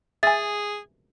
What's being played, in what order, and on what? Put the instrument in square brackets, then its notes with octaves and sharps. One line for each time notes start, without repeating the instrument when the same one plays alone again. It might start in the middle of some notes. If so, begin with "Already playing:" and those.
[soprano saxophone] G#4 [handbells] E5 G#5 [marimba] A6